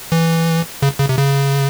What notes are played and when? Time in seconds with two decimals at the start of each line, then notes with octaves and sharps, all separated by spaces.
0.12 E3
0.82 C#3
0.99 C#3
1.09 C3
1.18 C#3